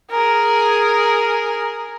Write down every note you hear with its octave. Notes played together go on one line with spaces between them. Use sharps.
G#4 A#4